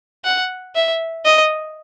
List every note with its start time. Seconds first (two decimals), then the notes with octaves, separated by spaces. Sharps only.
0.25 F#5
0.75 E5
1.25 D#5